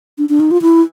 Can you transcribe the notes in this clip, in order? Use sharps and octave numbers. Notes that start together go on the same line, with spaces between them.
D4
D4
D#4
F4
E4